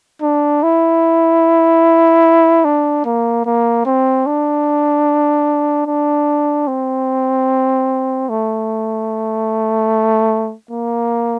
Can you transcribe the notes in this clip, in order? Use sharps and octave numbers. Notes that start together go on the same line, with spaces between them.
D4
E4
D4
A#3
A#3
C4
D4
D4
C4
A3
A#3